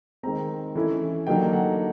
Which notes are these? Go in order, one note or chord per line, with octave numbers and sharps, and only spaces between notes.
D#3 G#3 C4 A#5
E3 A3 C#4 E4
D3 F#3 A#3 D#4 G5
F#5